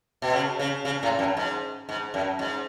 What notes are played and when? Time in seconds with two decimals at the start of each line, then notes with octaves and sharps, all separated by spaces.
0.22 B2
0.33 C#3
0.59 C#3
0.85 C#3
1.03 A2
1.19 F#2
1.37 G#2
1.89 G#2
2.14 F#2
2.39 G#2